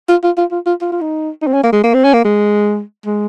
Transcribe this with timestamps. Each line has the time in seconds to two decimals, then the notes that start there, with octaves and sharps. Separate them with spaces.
0.09 F4
0.23 F4
0.37 F4
0.52 F4
0.66 F4
0.81 F4
0.92 F4
1.01 D#4
1.42 D#4
1.47 C4
1.53 C#4
1.63 A#3
1.72 G#3
1.84 A#3
1.94 C4
2.04 C#4
2.13 A#3
2.25 G#3
3.06 G#3